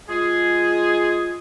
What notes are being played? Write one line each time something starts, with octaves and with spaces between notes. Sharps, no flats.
G#3 F4 G#4